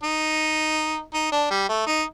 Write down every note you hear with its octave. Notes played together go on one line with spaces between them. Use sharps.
D#4
D#4
D4
G3
A3
D#4